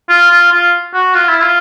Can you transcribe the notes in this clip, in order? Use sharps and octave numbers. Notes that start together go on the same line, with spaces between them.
F4
F4
F4
F#4
F4
E4
F4